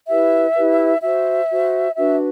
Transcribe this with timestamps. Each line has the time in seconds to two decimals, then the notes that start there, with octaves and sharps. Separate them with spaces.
0.08 E4 G4 B4 E5
0.55 E4 G4 B4
1.02 F#4 C5 E5
1.50 F#4 C5
1.96 D4 F#4 B4 E5